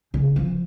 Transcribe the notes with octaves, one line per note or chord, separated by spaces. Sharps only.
C#3
F3